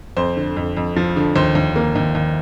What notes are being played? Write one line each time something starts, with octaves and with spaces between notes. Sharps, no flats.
F2 C5
D3
F2
F2
F3
D3
D#2 C5
D#2
A#3
D#2
D#2